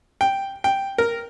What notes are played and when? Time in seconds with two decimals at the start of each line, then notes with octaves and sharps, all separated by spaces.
0.21 G5
0.64 G5
0.98 A#4